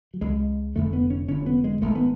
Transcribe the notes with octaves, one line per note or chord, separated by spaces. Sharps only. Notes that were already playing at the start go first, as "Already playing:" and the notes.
F#3
C#2 C#3 G#3
F1 F2 D3 A3
B3
C#4
F1 F2 D3 C#4
B3
G#3
G#1 G#2 A3
B3